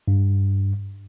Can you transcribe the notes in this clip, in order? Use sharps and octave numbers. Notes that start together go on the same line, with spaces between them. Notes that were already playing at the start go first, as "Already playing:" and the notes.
G2